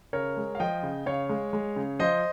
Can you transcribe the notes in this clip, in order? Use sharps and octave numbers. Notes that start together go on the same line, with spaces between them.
C#3 A#4 C#5
G#3
F5
F3 D#5 G5
C#3
C#3 C#5 F5
G#3
G#3
C#3
F3 C5 D#5